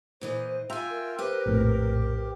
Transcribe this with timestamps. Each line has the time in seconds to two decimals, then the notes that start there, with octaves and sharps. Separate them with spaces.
0.21 A#2 E3 C5 D#5
0.70 F4 E5 G5 G#5 A#5
0.90 A#4
1.18 G4 B4 C5
1.46 A#1 F2 A2